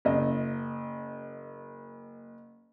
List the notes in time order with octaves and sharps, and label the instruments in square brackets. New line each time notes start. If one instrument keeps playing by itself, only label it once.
[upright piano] F#1 D#5